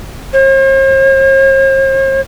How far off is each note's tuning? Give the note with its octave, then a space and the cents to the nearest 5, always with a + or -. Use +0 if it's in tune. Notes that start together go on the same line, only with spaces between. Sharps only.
C5 +45